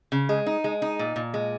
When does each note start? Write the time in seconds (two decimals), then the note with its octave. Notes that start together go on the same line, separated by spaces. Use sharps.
0.12 C#3
0.29 G#3
0.46 D#4
0.64 G#3
0.82 D#4
0.99 A#2
1.16 A#2
1.34 G#3